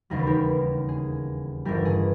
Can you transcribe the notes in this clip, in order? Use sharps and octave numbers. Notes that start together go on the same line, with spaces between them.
E1 D#2 C#3 G3 A#4
B4
G4 A#4
G#4
G1 G2 E3 G3 G4 A#4
G#4